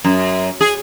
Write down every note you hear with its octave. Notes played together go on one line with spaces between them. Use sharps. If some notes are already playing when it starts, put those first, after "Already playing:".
F#2
G#4